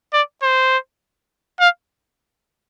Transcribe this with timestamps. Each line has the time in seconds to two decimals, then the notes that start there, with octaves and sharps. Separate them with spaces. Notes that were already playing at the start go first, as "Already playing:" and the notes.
0.13 D5
0.43 C5
1.60 F5